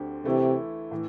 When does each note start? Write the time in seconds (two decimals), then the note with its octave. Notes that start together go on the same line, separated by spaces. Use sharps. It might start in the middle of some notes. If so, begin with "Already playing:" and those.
Already playing: D2 D3 C4 G4
0.25 C3 E3 A3 E4
0.91 A2 E3